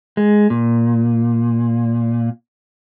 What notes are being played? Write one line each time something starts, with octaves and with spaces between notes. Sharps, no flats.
G#3
A#2